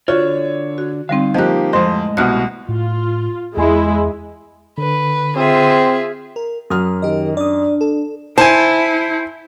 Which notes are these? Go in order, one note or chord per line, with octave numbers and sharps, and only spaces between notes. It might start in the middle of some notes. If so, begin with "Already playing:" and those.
D3 F4 F#4 C#5 D5
F#4
D3 G3 C4 D#4 F5
F3 A#3 G4 D#5 F#6
F2 A2 G#3 C5 D#5 C6
C2 B2 F#5 F6 F#6
A2 F4
E2 G#3 E4 G#5 C6
D3 B4
C4 F4 G#4 E5
A#4
F#2 D#6 F6
D#3 G4 D#5
D4 D5 D#6
A4
E4 C5 G#5 A5